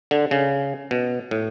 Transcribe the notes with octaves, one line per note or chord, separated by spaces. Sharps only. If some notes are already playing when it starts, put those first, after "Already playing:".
D3
C#3
B2
A2